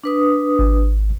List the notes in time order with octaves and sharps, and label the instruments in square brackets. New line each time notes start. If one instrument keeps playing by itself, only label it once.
[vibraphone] D4 B4 D#6
[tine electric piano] G#1